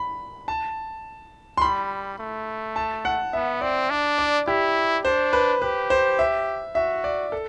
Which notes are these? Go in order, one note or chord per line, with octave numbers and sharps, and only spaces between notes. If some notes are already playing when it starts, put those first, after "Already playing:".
Already playing: B5
A5
C6
G3 B5
A3
A5
F#5
B3 E5
C4 D5
D4
D5
E4 G4
D4 C5
B4
G4 B4
C5
E5
F#4 E5
D5
A4